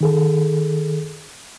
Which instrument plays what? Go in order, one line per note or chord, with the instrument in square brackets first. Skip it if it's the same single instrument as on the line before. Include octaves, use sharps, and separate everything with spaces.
[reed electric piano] D#3 G#4 A4